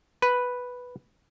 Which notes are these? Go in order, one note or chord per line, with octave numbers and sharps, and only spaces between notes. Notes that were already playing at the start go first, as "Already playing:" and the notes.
B4